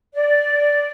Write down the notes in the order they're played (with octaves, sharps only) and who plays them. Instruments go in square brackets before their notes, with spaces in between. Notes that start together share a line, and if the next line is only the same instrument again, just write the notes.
[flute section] D5